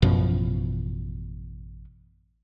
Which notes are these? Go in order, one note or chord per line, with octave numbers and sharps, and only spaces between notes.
A1 F#2 B2 F3